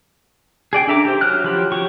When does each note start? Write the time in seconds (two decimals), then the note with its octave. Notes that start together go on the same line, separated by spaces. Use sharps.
0.73 G#4 D5 G5
0.87 D4 A4 E5 A#5 D6
1.05 G4 C5
1.21 F#3 F6 F#6
1.44 F3 F#3 G4 B5
1.72 F#3 G4 C#6